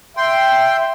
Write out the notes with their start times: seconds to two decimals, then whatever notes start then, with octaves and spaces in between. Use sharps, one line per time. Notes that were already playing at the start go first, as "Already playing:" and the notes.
0.17 E5 G5 C6